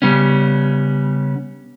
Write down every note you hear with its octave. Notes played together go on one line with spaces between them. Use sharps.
C#3 G3 B3 C#4